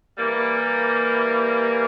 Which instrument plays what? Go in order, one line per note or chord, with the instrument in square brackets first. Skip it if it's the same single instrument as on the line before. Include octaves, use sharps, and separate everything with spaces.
[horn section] E3 G3 A#3